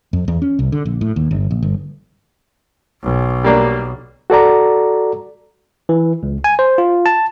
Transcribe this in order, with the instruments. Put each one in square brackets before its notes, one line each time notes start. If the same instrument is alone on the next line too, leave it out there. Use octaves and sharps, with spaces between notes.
[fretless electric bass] F2
E2
C#4
C2
D3
A#1
A2
D#2
G1
A#1
G1
[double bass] B1
[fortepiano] G3 A#3 D4
[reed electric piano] F#4 A4 D5 A#5
[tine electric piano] E3
C#2
G#5
C5
F4
A5